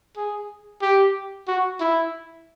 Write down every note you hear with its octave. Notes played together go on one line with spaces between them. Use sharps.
G#4
G4
F#4
E4